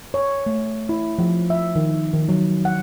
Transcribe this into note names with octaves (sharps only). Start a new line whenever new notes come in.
C#5
A3
E4
F3
E5
D#3
D#3
F#3
F#5